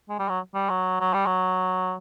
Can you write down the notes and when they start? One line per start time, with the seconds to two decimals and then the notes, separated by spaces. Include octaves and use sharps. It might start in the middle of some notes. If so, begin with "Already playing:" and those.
0.09 G#3
0.19 G3
0.29 F#3
0.54 G3
0.70 F#3
1.00 F#3
1.14 G3
1.26 F#3